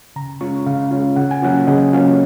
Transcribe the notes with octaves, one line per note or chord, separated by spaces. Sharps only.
C#3 A#5
G#3 C#4 F4 C#6
C#3 F5
G#3 C#4 F4
C#3 F#5
G#5
F#3 A#3 C#4 F4 F#5
C#3 D#5
F#3 A#3 C#4 F4 C#5